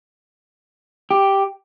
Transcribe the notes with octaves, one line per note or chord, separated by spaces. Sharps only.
G4